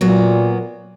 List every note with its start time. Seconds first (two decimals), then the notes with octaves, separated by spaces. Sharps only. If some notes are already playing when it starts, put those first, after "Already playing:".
0.01 A#2 F#3 A#3 B3